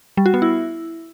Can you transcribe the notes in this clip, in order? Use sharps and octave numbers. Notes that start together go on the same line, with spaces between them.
G3
F#4
B3
E4